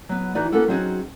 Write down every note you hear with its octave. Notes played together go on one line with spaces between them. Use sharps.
F#3 B3
E3 D#4 F#4 B4 D5
A#3 B3 C#4 F#4 A4 A#4
F#3 C4 C#4 D#4 F#4 G#4